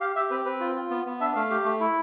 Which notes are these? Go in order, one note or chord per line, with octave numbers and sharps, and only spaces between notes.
G4 F5
G4 E5
C4 B4
C4 B4
F4
F4
B3
B3
D4 E5
A3 F5
G4
A3
E4